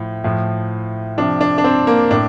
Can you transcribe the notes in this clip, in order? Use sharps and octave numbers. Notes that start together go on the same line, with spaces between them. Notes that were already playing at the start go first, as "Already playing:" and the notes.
Already playing: A2 F3
A2 F3
C3 F3 D4
D4
D4
C4
A#3
A2 D4